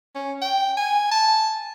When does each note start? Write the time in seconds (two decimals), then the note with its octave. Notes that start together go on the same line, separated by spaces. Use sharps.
0.15 C#4
0.42 G5
0.77 G#5
1.11 A5